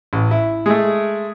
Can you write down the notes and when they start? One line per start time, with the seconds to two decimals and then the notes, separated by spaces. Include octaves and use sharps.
0.13 A1
0.31 E4
0.66 G#3 A3